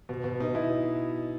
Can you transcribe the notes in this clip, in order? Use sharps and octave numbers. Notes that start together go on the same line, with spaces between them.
B2
B2
B2 D#4
B2 E4